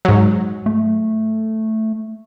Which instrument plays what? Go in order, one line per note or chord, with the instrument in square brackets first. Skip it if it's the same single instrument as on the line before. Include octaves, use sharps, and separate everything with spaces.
[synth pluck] G#2 F#3
[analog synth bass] A3